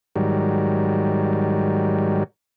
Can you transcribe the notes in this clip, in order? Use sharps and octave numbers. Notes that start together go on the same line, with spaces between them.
G#2 D#3 F#3 G3